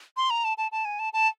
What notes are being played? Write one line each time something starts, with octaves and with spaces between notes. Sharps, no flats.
C6
A#5
A5
A5
A5
G#5
A5
A5